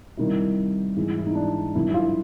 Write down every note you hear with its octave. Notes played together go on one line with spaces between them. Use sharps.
C3 D#3 G3 E4
G#2 E3 G#3
E4
D#4
D4
G2 D#3 F#3 E4
E4
F4